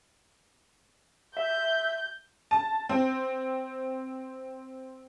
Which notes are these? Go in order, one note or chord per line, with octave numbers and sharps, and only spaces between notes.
E5 G6
A5
C4